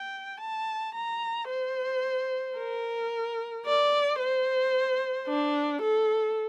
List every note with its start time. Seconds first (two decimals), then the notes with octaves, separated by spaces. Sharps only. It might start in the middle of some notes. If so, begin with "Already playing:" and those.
Already playing: G5
0.41 A5
0.95 A#5
1.49 C5
2.58 A#4
3.66 D5
4.19 C5
5.28 D4
5.82 A4